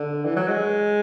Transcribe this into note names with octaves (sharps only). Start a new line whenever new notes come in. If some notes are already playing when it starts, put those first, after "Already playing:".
Already playing: D3
E3
F#3
G#3